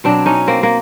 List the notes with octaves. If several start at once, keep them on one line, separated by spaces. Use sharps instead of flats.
B2 F#3 C4 D4
C#4 D#4
A#3 C4
A#3